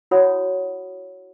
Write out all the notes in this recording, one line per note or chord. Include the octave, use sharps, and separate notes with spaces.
E4 F#4 C#5 F#5 B5 D#6